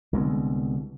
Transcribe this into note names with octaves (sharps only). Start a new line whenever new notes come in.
C2 D3 G#3 B3